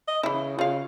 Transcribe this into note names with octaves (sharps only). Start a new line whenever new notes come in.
D#5
C#3 E3 E4
C#3 F4 F5